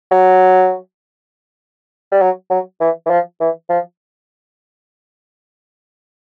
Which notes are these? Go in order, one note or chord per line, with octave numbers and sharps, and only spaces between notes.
F#3
G3
F#3
F#3
E3
E3
F3
E3
F3